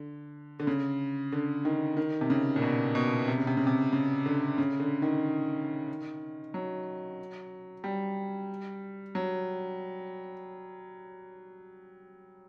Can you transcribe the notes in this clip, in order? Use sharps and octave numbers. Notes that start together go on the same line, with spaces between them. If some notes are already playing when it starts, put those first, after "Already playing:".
Already playing: D3
D3
C#3
D3
D#3
D#3
C3
C#3
A#2
B2
B2
C3
C#3
C3
C#3
C3
C#3
D3
C#3
D3
D#3
F#3
G3
F#3